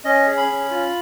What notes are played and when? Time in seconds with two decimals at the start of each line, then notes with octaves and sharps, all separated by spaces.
0.04 C#4 D#5
0.27 G#4
0.37 B5
0.48 C#4
0.71 F4